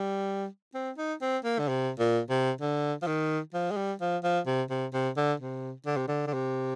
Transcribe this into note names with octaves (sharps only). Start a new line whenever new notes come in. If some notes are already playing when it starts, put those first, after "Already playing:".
Already playing: G3
C4
D#4
C4
A#3
D3
C3
A#2
C3
D3
F3
D#3
F3
G#3
G3
F3
F3
C3
C3
C3
D3
C3
D3
C3
D3
D3
C3